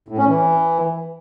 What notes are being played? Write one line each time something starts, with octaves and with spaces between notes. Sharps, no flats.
A2
C#4
E3